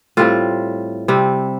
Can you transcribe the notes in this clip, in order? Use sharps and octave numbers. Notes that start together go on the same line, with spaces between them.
A2 G3 C4 F4
C3 G3 C4